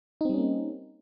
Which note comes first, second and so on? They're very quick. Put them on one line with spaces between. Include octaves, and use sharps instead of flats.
D#4 C4 G3 C#4 A#3